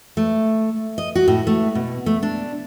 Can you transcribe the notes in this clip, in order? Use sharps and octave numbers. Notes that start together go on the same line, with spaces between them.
A3
D#5
F#4
A2
A3
B2
A3
D4